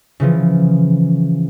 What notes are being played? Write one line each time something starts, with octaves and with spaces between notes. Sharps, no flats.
C#3 E3 F3